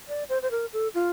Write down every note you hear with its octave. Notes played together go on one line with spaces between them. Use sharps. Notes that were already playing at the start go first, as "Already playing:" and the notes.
D5
C5
C5
A#4
A4
F4